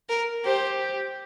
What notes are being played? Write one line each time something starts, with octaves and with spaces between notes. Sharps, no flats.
A#4
G4 C5